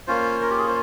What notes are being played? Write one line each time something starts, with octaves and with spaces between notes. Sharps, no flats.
A#3 C#4 F4 C5
A#4
G4
G#4
C5